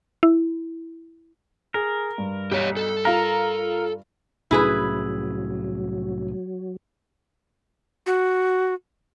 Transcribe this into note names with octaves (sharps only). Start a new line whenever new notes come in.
E4
G#4 A#4
G2
B1 G4 C#5 B6
A4
F4 A#4 F5 A#5
C2 A2 F#3 C#4 E4 G#4 B4
F#4